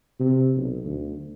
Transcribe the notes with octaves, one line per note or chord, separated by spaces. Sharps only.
C3
B1
D2